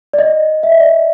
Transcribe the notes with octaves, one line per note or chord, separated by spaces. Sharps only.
D5
D#5
E5
D#5
D5